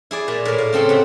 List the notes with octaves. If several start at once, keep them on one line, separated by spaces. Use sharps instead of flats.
E4 G#4 D5
A#2
A2 A#4
F5
C#3 C4 A4 C6
C3 F#5